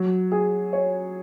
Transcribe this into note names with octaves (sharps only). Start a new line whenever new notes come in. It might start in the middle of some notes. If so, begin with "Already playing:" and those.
Already playing: F#3
G#4
C#5